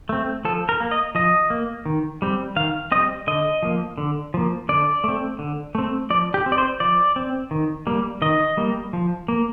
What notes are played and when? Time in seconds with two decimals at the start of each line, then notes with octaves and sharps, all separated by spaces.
0.09 A3 C4
0.45 F3 A4
0.69 A#4
0.80 A#3
0.91 D#5
1.15 F3 D#5
1.50 A#3
1.86 D#3
2.22 G3 C4
2.56 D#3 F5
2.92 G3 C4 D#5
3.27 D3 D#5
3.63 F3 A#3
3.98 D3
4.34 F3 A#3
4.69 D3 D5
5.04 A3 C4
5.39 D3
5.75 A3 C4
6.10 F3 D5
6.34 G4
6.46 C4
6.52 D5
6.58 C5
6.80 F3 D5
7.16 C4
7.51 D#3
7.87 G3 A#3
8.22 D#3 D#5
8.57 G3 A#3
8.93 F3
9.28 A#3